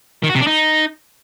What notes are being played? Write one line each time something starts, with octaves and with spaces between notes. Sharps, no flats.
D#3
F#4
C3
D4
D#4